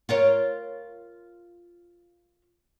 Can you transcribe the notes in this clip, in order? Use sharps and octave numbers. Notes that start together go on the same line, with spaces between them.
F4 A#4 C#5